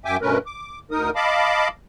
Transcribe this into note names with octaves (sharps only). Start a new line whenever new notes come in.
F#2 E5 G5 G#5 D6
G2 B2 A3 C#4 A#4 B4
D6
D2 D#4 A#4 D#6
D#5 F5 A5 B5 D6